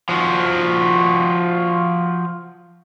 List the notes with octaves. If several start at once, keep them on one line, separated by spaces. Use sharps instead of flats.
F3 F#4